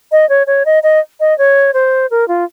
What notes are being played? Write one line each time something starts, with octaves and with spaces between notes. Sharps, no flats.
D#5
C#5
C#5
D#5
D#5
D#5
C#5
C5
A#4
F4